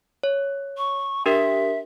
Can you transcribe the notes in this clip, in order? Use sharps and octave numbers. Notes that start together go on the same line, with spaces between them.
C#5
C#6
D4 G4 A#4 E5